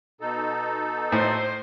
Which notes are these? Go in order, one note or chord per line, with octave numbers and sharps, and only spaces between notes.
B2 D#4 A4
A2 C5